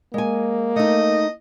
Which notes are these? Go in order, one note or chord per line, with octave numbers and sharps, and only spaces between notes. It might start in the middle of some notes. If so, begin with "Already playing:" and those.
G#3 A#3 G#5
A3 D#4 D#5